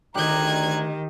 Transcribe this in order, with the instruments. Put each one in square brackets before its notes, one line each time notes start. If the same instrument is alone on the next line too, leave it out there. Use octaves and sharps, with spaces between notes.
[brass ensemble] D2 A#5 [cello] D#3 [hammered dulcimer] G4 D#5 [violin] F#6 G#6